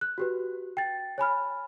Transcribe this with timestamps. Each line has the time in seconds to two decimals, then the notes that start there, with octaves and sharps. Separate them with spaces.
0.01 F#6
0.18 F#4 G4 B4
0.77 G5 A6
1.18 C#5 G#5 B5 F6